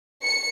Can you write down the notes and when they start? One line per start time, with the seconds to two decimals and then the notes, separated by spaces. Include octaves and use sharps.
0.23 C#7